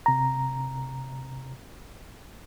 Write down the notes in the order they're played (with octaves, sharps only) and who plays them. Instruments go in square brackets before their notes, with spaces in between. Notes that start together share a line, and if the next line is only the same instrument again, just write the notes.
[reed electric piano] C3 A#5